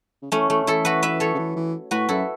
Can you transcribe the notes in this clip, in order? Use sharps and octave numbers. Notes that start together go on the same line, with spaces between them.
C#3
E3 A3 C#4
E3 A3
C#3
E3 E4 A4
F#4 B4
B4 E5
A4 C#5
C#3
E3
E3
A2 F#4 B4
F#2 E4 A4